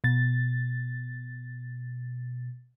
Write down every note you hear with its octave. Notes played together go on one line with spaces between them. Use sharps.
B2 A6